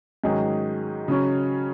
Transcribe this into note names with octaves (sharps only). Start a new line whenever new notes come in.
G#2 D#3 F#3 C#4 G#4
C#3 F#3 C#4